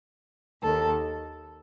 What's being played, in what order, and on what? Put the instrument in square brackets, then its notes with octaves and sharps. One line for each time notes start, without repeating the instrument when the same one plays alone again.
[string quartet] D#2 D#3 A4